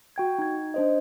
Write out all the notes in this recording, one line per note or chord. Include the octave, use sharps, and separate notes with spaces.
F#4 G5 G#6
D#4 G#6
D4 C5 D#5